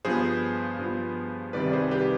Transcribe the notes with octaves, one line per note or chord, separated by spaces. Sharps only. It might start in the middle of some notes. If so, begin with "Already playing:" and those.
G2 F3 B3 G#4 C5
G2 F3 B3
C2 C3 D#3 G3 B4 D5
G#4 C5
G4 B4